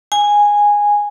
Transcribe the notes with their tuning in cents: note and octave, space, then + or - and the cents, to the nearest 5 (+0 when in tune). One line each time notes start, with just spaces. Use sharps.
G#5 -10